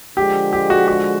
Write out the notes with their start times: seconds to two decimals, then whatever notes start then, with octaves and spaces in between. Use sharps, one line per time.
0.17 D3 F3 G#3 G4
0.53 G4
0.70 F#4
0.88 F#4